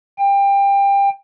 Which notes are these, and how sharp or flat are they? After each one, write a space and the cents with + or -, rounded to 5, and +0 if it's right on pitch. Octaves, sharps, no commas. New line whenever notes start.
G5 +25